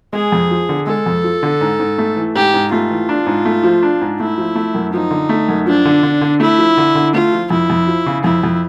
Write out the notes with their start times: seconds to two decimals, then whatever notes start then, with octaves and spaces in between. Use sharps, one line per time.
0.13 G#3 G#4
0.32 F2
0.51 F3
0.69 D3
0.87 G#3 A4
1.06 F2
1.24 F3
1.43 D3
1.61 G#2
1.80 G#2
1.98 A3
2.16 E3
2.35 G#2 G4
2.54 G#2
2.72 A3 F4
2.91 E3
3.09 D4
3.26 G#2
3.45 A3
3.63 F3
3.83 D4
4.01 G#2
4.20 A3 E4
4.38 F3
4.55 A3
4.75 F#2
4.93 F3 D#4
5.11 D3
5.29 A3
5.48 F#2
5.67 F3 D4
5.85 D3
6.03 D3
6.21 D3
6.40 A3 E4
6.58 F3
6.77 D3
6.95 D3
7.14 A3 F4
7.32 F3
7.50 F2 E4
7.70 F2
7.87 F3
8.06 C#3
8.24 F2 E4
8.43 F2